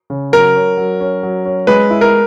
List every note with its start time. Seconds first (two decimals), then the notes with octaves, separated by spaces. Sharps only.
0.10 C#3
0.32 F#3 A#4
0.56 C#4
0.77 F#3
1.00 C#4
1.23 F#3
1.45 C#4
1.67 G#3 B4
1.90 E4
2.01 A#4